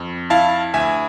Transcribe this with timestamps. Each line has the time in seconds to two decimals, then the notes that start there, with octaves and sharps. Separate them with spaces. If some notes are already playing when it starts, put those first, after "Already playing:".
Already playing: F2
0.30 E4 F5 A5
0.74 D2 E5 G#5